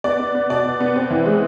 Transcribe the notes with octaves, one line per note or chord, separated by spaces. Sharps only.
B3 D5
B3
B3
B2 D5
B2
B3
C4
E3
G#3